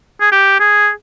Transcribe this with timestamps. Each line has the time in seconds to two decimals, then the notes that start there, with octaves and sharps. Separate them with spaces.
0.20 G#4
0.32 G4
0.60 G#4